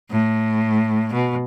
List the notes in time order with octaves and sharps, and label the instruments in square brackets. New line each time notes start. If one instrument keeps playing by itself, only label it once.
[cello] A2
B2